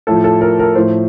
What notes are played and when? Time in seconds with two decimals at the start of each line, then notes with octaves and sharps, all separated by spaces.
0.07 A2 F3 A4
0.24 A4
0.41 A#4
0.59 A#4
0.75 A2 F3 C5